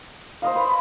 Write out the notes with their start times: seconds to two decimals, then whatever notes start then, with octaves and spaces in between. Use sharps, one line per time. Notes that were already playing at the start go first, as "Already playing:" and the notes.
0.42 C5 D#5 F5
0.56 B4 B5